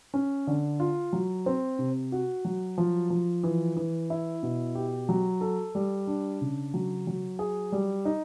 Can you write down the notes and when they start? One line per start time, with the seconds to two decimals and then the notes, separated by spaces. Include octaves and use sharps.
0.14 C#4
0.47 D3
0.80 F4
1.13 F#3
1.46 C4
1.79 C3
2.12 F#4
2.45 F#3
2.78 F3
3.10 F3
3.43 E3
3.76 E3
4.10 E4
4.43 B2
4.75 G4
5.09 F#3
5.41 A4
5.75 G3
6.07 D4
6.41 C#3
6.74 F#3
7.07 F#3
7.39 G#4
7.72 G3
8.05 D#4